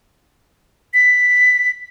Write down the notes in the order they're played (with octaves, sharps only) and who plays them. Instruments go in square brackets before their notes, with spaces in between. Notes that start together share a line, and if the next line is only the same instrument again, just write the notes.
[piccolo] B6